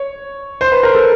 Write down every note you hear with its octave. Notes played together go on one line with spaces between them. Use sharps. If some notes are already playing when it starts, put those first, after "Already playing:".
Already playing: C#5
C5
B4
A#4
A4